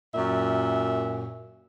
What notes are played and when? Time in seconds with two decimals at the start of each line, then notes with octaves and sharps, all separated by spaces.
0.15 F#2 A#2 E5